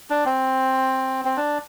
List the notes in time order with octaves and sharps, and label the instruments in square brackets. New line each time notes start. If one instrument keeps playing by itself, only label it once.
[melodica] D4
C4
C4
D4